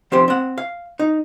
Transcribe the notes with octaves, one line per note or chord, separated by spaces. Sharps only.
F3 C4 G4 C5
C4 F#5
F5
D#4